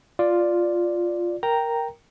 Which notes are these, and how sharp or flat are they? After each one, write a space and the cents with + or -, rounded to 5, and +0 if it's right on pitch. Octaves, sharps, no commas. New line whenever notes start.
F4 +0 D5 +0
A#4 +0 G5 +0 A#5 +0